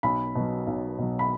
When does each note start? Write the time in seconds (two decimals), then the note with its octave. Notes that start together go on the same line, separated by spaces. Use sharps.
0.03 B1 B5
0.35 B2 F#3
0.67 B1
0.98 B2 F#3
1.19 B5